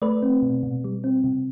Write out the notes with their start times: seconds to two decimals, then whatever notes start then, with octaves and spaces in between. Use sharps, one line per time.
0.02 A3 B4 D5
0.22 C4
0.42 B2
0.63 B2
0.84 G3
1.04 C4
1.24 C3